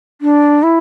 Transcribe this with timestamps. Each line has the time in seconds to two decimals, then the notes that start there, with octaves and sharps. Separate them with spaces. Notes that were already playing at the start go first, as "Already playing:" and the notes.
0.21 D4
0.63 E4